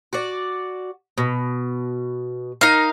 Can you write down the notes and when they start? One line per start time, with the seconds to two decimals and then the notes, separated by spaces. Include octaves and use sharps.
0.13 F#4 D5
1.18 B2
2.61 D#4 A#4 F5